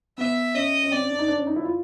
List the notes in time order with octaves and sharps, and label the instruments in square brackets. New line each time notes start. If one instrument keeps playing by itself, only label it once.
[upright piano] B3 [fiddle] E5
[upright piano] C#4 [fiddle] D#5
[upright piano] C#4
[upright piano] C4 [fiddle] D5
[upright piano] C#4
D4
D#4
D4
C#4
D#4
E4
F4